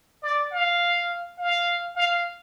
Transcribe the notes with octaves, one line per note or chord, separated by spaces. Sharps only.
D5
F5
F5
F5